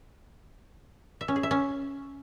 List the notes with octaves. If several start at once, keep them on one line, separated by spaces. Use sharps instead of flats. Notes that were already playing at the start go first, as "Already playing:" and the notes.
E5
C#4
G#4
E5
C#4